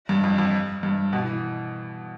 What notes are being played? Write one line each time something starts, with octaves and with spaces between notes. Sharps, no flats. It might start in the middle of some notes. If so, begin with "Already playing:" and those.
G2
F2
F2
G2
B2
E3